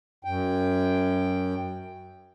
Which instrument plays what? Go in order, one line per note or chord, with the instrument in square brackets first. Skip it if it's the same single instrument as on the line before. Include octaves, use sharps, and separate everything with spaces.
[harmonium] F#2 G5